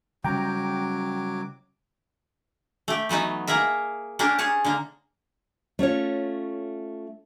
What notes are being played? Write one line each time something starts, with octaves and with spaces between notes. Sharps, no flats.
C#3 F#3 G3 C#4 G5 A#5 D6
A3 G4
E3 F#3 B3 D#4
A#3 G#4 A#4 E5
A#3 C#4 D4 G4 A#4
G#4 C#5 A5
D3 A#3
A3 C#4 F4 C#5